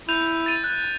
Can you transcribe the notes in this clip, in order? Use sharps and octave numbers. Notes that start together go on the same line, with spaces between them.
E4 G6 D#7 F7
A6 D#7 F7
F#6